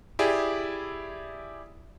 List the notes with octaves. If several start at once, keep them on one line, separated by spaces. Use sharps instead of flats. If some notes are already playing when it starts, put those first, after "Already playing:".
E4 G4 G#4 D5